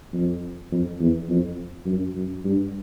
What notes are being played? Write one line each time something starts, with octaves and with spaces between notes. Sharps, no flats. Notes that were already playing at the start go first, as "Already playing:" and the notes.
F2
F2
E2
F2
F#2
F#2
G2